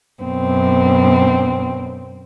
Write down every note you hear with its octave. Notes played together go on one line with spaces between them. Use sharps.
F#2 B2 C4